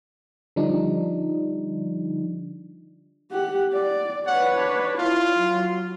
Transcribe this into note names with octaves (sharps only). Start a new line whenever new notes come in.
D3 F3 G3 D4 D#4
G4 F#5
D5
B4 C#5 F#5
D4
E4 F4
F#3